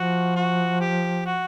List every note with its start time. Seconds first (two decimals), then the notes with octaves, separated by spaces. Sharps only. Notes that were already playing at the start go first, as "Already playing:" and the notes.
Already playing: F3 F#4
0.36 F#4
0.81 G4
1.26 F#4